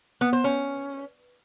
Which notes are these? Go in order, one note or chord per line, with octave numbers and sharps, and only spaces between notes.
B3
C5
C#4